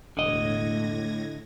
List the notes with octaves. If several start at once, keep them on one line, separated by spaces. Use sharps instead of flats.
E1 A2 D3 D#5 G#6 A#6